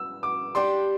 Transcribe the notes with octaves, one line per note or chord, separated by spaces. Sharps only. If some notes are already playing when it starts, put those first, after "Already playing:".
Already playing: E6
D6
G3 D4 G4 C6